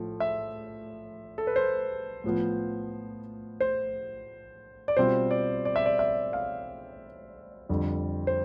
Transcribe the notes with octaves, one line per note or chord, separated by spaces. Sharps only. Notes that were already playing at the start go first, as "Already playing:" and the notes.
Already playing: A2 F3 A3
E5
A4
B4
C5
A2 F3 B3 F4
C5
D5
B2 G3 C4 F4 C5
D5
D5
E5
D5
E5
F5
F2 D3 G3
C5